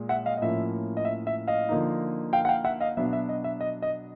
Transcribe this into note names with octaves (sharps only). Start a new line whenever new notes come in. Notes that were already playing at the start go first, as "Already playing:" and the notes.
Already playing: A#2 G#3
E5 F#5
D#5 F5
D#5
A2 F3 A#3 C#4 E5
D#5
E5
E5
D#5 F5
D3 F3 A#3 D#4
F5 G5
F#5
F5 G5
E5 F#5
D#5 F5
B2 F#3 B3 D4 E5
E5
D#5
E5
D#5
D#5